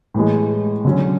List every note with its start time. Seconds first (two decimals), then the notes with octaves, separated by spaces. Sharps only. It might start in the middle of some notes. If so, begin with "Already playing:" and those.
0.14 A2 E3 G#3
0.85 D3 F#3 C#4